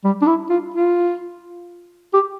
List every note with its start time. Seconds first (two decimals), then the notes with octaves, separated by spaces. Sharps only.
0.04 G3
0.22 D4
0.27 E4
0.50 F4
0.74 F4
2.14 G4